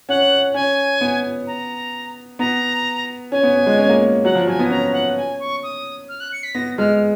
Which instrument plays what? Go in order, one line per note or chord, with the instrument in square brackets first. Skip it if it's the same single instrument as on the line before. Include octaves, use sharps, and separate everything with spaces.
[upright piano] C#4 [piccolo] F#5
[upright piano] C#4 [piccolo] G#5
[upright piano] B3
[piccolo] A#5
[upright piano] B3 [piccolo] A#5
[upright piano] C#4 [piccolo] G#5
[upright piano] B3
B3
G#3
C#4
A#3
[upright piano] F#3 [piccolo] F#5
[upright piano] F3
[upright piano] F#3 [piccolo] G#5
[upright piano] B3
[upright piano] C#4 [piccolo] A#5
[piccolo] F#5
G#5
C#6
D#6
F6
F#6
C#7
B6
[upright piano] B3 [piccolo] A#6
[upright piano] G#3 [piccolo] F6